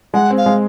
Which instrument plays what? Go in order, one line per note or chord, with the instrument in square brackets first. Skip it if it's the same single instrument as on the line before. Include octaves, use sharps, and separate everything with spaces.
[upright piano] G#3 [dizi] F#5
[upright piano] C4
[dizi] F5
[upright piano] G#3